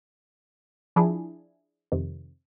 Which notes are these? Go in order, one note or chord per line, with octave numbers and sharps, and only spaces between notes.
F3 D4 E4 G#4
F2 C3 D#3